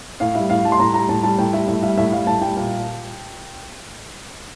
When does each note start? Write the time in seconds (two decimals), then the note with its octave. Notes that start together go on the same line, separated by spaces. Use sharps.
0.20 A2 F5
0.35 G3 E5
0.50 A2 F5
0.65 G3 A5
0.72 C6
0.79 A2 A#5
0.94 G3 A#5
1.09 A2 A5
1.23 G3 A5
1.38 A2 G5
1.53 G3 E5
1.68 A2 E5
1.83 G3 E5
1.98 A2 E5
2.12 G3 F5
2.27 A2 A5
2.41 G3 G5
2.57 A#2